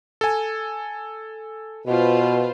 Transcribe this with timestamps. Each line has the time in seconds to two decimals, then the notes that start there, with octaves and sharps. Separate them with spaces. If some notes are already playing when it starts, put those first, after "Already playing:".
0.21 A4 G#5
1.87 B2 F4 B4 C5